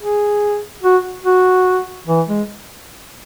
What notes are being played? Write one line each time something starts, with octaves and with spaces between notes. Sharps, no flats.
G#4
F#4
F#4
E3
G#3